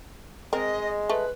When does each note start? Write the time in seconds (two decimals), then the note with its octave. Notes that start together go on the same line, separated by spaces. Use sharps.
0.53 G#3 C4 A#4 D#5
1.09 A3 B4